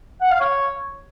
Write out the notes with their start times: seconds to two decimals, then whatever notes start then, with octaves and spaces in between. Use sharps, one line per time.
0.21 F#5
0.31 F5
0.41 C#5